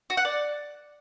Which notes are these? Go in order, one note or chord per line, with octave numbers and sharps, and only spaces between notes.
F#4
F#5
D5